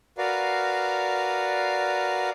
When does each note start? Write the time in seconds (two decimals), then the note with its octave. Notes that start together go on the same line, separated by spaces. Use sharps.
0.18 F#4 A#4 B4 D5 F5